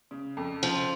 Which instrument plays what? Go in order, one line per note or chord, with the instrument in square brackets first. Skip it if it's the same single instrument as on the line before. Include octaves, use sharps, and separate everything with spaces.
[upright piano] C#3
F2
[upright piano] C#3 [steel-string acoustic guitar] F3